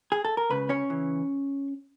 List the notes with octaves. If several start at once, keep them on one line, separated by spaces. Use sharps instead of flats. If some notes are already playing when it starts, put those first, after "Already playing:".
G#4
A4
A#4
C#2 C#3 B4
C#4 C#5
C#3 E3